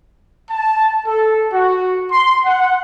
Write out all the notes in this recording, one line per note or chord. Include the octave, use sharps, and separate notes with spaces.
A5
A4
F#4
C6
F#5